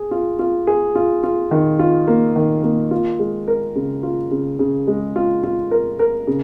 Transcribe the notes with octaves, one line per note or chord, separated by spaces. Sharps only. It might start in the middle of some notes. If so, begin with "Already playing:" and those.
Already playing: G#4
F4
F4
G#4
F4
F4
D#3
F4
A#3
D#3
A#3
F4
G#3
A#4
C#3
F4
C#3
C#3
G#3
F4
F4
A#4
A#4
C#3